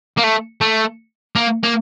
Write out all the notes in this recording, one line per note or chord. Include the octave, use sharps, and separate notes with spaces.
A#3
A3
A3
A#3
A#3